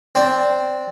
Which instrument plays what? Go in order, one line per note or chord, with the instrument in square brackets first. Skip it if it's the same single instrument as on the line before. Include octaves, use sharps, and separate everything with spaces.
[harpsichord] C4 D4